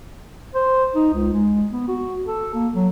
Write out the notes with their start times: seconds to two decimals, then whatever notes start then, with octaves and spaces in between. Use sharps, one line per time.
0.55 C5
0.95 D#4
1.14 C#2
1.33 G#3
1.71 B3
1.88 F#4
2.27 A4
2.54 A#3
2.75 F#3